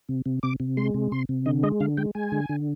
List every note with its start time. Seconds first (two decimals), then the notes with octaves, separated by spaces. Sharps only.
0.09 C3
0.26 C3
0.43 C3 D6
0.60 C3
0.77 G#3 C6
0.94 C3
1.12 C3 C6
1.29 C3
1.46 D3 D#5
1.63 G#3 D#5
1.80 D3 F5
1.97 G#3 G5
2.15 G#3 G#5
2.32 D3
2.49 D3